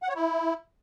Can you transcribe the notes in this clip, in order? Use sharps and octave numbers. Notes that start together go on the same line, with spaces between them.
F#5
C#5
E4